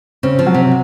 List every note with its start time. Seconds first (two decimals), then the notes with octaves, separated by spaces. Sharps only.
0.23 C#3 C4
0.39 F3
0.47 F#3
0.54 C3